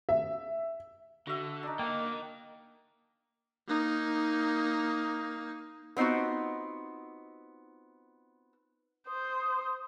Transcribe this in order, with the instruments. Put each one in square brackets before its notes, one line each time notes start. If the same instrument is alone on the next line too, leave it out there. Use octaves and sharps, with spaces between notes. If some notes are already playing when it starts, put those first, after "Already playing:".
[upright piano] E5
[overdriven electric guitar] D3 [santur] F#4 E5
[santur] D4 D#4
[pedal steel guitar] A#3 [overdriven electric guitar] D#5 G5
[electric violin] A#3 D#4
[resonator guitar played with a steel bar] B3 C4 D#4 F4 F#4
[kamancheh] C5 [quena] D#6